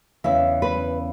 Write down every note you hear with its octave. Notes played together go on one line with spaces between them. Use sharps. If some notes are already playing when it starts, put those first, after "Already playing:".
E2 C#3 E3 E5
B4